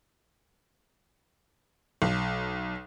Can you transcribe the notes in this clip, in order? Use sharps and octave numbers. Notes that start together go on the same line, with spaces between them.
B1